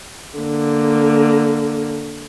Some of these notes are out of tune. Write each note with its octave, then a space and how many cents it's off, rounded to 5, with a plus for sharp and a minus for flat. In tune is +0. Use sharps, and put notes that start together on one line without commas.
D3 +0 A#3 -5